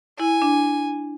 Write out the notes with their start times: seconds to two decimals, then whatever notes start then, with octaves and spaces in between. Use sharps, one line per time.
0.19 E4 G#5
0.42 D4